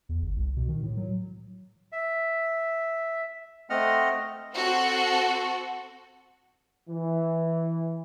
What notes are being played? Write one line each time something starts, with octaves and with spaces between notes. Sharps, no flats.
E2
G1
C2
B2
D#3
A2
F#3
E5
A3 C4 D#5 F#5 F6
C4 F#4 A4
E3